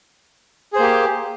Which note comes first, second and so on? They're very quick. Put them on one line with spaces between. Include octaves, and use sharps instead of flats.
G#4 C5 A#3 G4